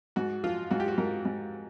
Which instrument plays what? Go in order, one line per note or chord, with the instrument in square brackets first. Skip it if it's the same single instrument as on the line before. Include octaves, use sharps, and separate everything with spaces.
[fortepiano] G#2 F#4
F3 F4
G#2 F#4
G4
F#4
G#2 A#4
G#2